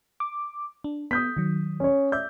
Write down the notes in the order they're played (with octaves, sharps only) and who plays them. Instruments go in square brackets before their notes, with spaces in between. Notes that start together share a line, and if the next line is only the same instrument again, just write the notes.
[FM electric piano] D6
D4
[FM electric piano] B3 [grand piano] D#6 G6 B6
[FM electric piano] D#3 F#3
[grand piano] C#4 C#5
[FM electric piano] D5 E5 [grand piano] G6